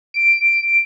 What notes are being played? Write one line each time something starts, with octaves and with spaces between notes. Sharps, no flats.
D7